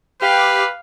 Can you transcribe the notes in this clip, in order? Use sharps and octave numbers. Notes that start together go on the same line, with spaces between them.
G4 B4 F5